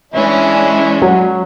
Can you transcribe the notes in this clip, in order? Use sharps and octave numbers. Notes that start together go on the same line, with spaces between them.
E3 G#3 C#4 D4 E4
F#3